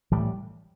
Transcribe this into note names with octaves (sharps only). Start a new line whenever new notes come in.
A2 E3 G3